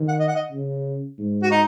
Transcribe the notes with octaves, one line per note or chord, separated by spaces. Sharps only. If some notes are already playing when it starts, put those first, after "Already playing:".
Already playing: D#3
F#5
D#5
F#5
D#5
C#3
G#2
F#4
D#4